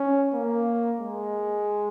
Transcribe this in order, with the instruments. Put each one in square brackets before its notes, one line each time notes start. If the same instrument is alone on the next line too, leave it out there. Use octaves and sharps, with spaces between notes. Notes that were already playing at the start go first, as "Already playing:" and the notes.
Already playing: [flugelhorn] C#4
A#3
G#3